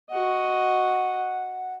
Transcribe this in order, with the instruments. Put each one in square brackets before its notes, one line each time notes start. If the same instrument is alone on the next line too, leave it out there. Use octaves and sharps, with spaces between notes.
[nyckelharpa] F#4 D#5 [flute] F#5